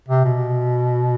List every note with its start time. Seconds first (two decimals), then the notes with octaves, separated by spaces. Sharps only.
0.08 C3
0.24 B2